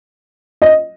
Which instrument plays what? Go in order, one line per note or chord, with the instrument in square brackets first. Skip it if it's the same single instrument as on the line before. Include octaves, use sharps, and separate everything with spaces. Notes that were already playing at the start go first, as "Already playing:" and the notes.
[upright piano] D#5